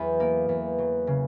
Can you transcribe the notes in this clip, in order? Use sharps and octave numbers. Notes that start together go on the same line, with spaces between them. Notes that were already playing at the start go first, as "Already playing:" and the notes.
Already playing: E2 F#3
A#3
E2
F#3
C#3